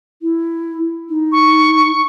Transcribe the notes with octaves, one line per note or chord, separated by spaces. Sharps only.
E4
D#4
C#6